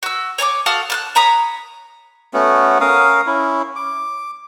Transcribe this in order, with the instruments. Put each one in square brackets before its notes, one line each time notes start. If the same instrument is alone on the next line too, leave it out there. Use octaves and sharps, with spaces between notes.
[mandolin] F#4 E6
C#5 G#5 A5 D6
F#4 A4 F5 D#6
A5 F6 F#6
C#5 A#5 B5 D#6
[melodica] A3 B3 C#4 F#4
C#4 A#4 F5 D#6
C#4 E4
D6